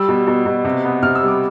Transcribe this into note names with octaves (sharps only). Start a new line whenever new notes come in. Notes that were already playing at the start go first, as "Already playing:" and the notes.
Already playing: G3 E6
B2
B2
B2
C3
B3
C3 F6
E6
G3
D6